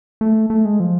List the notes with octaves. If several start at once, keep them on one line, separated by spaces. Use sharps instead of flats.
A3
A3
G#3
F3